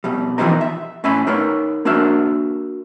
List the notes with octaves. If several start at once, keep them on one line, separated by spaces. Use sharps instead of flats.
B2 G3
E3 F3 G3 B3 D#4 A#4
E5
A2 C#4 E5 G#5 B5
D#4 A#4 B4 C#5
A#3 D4 F#4 A#4 E5